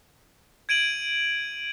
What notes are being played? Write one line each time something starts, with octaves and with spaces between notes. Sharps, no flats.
G#6 D7 D#7 F#7